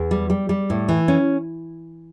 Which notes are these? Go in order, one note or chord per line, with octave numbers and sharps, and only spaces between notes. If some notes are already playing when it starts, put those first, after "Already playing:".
Already playing: E2
G3
G3
G3
A2
E3
C#4